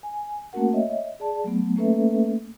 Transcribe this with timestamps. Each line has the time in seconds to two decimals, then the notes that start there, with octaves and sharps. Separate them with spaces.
0.03 G#5
0.53 A3 A#3 C#4 F#4 A#4 F#5
0.73 C#5 D#5 E5
1.20 G#4 D5 A5
1.44 F#3 A3 B3
1.76 A3 A#3 C#4 A4 B4 E5